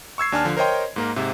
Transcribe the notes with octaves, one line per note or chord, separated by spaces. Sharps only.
C#6 E6 G#6 C7
D#2 D4 G#5 A5 F6
D3 F3
A#4 C5 C#5 D#5 G5 C6
G#2 A#3 A#4
G#2 C3 E5